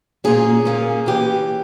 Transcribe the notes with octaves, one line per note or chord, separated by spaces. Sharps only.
A#2 A#3 C#4 G#4
A#2 A#3 C#4
E3 A#3 C#4 G4